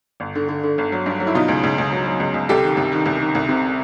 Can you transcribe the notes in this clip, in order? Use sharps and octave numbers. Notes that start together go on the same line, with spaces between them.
G1
D3
D3
D3
G1
F#3
G2
F#3
E4
B2 D#4 F4
C#2
C#2
C#2
F#3
F#3
C#2
C#2
C2 G4 A4
D#3
C2
D#3
C2
D#3
C2
C3